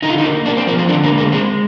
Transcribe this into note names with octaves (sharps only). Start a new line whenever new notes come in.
D3 D#4
F4
D#4
A#3
A#3 D4
C4
F3 A#3
C4
D3 D4
A#3
G#3
A#3
G#3 C4